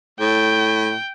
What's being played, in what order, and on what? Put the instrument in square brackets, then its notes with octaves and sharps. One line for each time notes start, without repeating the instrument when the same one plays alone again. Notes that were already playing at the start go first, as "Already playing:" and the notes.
[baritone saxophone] A2 [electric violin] G5